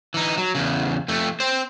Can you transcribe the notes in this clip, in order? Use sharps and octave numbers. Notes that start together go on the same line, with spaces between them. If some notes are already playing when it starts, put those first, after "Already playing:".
E3 D#4
F#3
E2 C#3
F2 A3
C4 C5